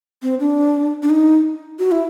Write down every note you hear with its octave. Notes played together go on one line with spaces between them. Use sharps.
C4
D4
D4
D#4
F#4
E4